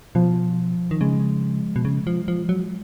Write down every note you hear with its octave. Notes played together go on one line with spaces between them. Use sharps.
B2 F3
D#3
C#3 G#3
B2
C#3
F3
F3
F#3